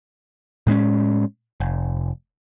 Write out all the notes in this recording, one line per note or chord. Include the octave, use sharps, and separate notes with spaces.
A2 G#3 B3 C#4
F1